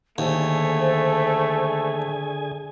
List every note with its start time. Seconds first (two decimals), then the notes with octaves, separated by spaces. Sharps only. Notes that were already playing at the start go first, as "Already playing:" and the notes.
0.18 D#2 D3 A3 G#4 C5 G#5